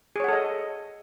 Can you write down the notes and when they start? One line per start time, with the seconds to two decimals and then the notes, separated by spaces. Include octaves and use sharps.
0.16 G#4
0.20 C#5
0.24 F#5
0.28 A4
0.33 D#5